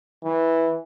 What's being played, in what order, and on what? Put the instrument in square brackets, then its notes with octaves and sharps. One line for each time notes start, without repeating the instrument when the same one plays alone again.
[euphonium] E3